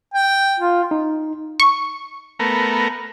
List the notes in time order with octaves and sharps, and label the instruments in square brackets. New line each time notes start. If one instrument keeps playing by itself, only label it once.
[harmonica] G5
[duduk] F4
[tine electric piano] D#4
[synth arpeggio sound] C#6
[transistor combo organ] A3 B3 A#4